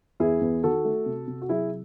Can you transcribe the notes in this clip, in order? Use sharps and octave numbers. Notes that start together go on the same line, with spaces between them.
E2 E4 G#4
E2
D#3 F#4 A4
A3
C3
C3
F#4
F#3 E4 G#4